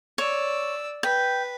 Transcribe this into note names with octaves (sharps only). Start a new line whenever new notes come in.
C#5 D5 E6
B4 G5